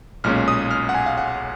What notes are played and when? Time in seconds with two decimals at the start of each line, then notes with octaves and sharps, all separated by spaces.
0.24 B1 A#2 G#3 C#4 F6
0.48 D#6
0.71 F6
0.89 F#5
0.94 G#5
1.06 F5
1.18 F#5